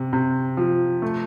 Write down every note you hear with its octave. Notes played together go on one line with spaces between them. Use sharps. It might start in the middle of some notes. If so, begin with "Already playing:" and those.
Already playing: C3
C3
F3
A3